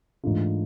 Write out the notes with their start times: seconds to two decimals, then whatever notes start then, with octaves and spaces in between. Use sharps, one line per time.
0.24 G#2 E3 A3 D4 F4